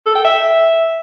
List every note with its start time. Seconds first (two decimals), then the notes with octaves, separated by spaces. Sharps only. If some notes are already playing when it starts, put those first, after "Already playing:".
0.06 A4
0.15 G5
0.25 E5